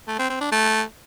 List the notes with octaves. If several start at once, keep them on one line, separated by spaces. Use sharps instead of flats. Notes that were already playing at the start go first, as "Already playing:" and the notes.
A3
C4
C4
D4
A3